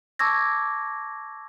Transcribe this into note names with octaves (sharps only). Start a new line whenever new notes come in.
A5 C#6 D6 E6 G#6 A#6